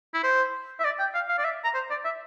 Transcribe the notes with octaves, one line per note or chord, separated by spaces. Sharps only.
E4
C5
E5
D5
G5
F5
F5
D5
E5
A#5
C5
D5
E5